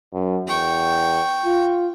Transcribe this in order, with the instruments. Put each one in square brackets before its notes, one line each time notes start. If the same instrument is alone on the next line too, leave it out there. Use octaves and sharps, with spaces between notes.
[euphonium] F#2
[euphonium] E2 [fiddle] G5 C#6
[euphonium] F4